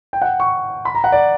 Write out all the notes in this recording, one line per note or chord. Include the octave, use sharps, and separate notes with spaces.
G5
F#5
C#6
B5
A#5
F#5
D5